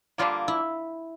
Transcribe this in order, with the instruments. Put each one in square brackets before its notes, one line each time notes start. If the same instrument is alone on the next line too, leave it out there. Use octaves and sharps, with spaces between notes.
[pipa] D3 G3 A#3 [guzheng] F4
[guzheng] E4